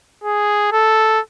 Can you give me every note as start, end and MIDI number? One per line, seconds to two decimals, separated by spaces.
0.23 0.72 68
0.72 1.20 69